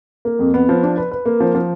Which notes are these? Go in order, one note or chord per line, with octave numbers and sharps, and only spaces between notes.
A#3
F2
B3
F3
D4
B4
B4
A#3
F3
F3